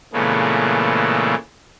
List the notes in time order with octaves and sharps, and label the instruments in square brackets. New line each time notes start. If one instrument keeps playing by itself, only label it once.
[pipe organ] A#2 C#3 E3 G#3 A3 B3